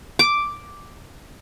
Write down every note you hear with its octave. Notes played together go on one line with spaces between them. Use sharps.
D6